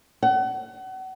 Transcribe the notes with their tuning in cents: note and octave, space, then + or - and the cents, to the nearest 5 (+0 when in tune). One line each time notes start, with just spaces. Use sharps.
F#5 +35